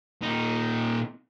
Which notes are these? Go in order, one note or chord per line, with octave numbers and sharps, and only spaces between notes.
A#2 D#4